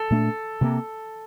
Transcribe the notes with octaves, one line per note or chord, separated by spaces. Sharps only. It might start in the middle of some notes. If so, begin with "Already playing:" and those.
Already playing: A4
A#2 A3 D4
C3 F3 A#3